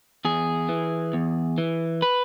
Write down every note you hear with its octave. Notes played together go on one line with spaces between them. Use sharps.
E2 G#4
E3
E2
E3
B4